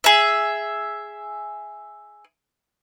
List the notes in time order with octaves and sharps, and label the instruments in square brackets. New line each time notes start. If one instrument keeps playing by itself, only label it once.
[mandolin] G#4 E5